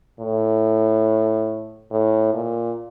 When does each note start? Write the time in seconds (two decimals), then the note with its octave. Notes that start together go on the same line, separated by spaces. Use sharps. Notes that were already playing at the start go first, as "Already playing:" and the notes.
0.19 A2
1.91 A2
2.34 A#2